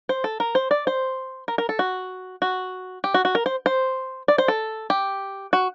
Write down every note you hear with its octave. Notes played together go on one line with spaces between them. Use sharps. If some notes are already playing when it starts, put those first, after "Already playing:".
C5
A4
A#4
C5
D5
C5
A#4
A#4
A4
F#4
F#4
G4
F#4
F#4
A#4
C5
C5
D5
C5
A4
G4
F#4